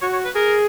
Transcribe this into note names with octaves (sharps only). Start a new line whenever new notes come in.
F#4 C#5
C#5
B4
G#4 A#4